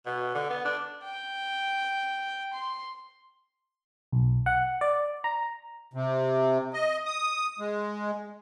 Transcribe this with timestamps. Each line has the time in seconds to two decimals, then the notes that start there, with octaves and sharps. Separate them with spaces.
0.06 B2
0.35 D3
0.50 B3
0.65 D4
1.03 G5
2.53 C6
4.12 B1
4.46 F#5
4.81 D5
5.24 A#5
5.94 C3
6.73 D#5
7.06 D#6
7.59 G#3